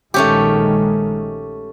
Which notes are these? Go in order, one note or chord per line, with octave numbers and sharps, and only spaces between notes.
A#1 D#3 G#3 A3 C#4 G4